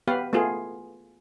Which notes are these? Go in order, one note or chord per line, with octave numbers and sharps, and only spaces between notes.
B3 G4 B4 F5
A3 B3 F4 G#4